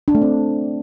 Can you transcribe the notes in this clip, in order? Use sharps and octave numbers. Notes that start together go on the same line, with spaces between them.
D4
A3
C4